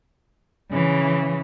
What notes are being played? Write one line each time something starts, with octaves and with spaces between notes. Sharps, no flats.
C#3 E3